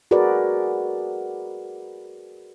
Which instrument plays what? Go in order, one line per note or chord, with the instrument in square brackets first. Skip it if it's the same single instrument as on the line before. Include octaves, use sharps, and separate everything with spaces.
[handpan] F#4 G#4 A#4 B4 D5